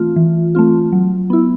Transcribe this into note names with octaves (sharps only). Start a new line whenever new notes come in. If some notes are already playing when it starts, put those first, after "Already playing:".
Already playing: E3 A3 C4 F4
E3
A3 C4 F4
F#3
B3 E4